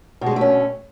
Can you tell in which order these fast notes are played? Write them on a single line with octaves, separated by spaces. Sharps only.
B2 G#3 D3 A3 C#4